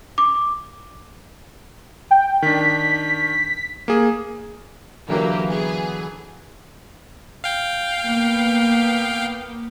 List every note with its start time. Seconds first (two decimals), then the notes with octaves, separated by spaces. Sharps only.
0.18 D6
2.11 G5
2.42 D#3 D4 B6
3.88 A#3 G#4
5.08 D3 E3 F#3 A#3 G4
5.47 B3 G#4
7.44 F5 G5
8.04 A#3 B3